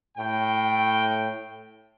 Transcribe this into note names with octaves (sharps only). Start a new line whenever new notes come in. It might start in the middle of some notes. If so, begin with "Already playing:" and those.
A2 G5